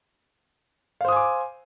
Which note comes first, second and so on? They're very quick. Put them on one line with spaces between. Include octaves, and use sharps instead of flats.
F5 C5 D#6 G#5 D6